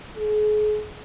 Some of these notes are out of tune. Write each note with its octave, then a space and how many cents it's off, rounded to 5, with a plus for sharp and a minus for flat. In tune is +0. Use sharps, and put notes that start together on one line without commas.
G#4 +35